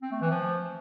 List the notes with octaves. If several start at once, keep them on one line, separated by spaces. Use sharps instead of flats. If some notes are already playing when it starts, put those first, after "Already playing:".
C4
A3
E3
F3